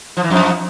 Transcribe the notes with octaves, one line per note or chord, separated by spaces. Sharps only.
F3
E3
F2 F3